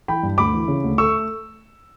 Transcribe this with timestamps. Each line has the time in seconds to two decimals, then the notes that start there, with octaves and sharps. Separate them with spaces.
0.08 E3 G5 B5
0.23 G2
0.38 D2 B5 D6
0.54 E3
0.68 C#3
0.84 D2
0.98 A3 C#6 E6